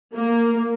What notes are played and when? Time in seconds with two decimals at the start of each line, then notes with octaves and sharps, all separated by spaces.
0.15 A#3